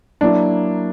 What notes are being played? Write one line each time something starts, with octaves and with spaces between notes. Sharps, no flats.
F#3 A#3 D4 E4